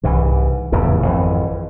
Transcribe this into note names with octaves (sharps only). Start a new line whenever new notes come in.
C2 G#2 E3
F1 E2 A2 C#3
G#1 F2 E3